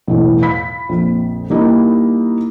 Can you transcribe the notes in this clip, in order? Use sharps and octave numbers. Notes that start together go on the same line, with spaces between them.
B1 E2 A2
F5 B5 B6
A#1 F2
G3 A#3 D#4 E4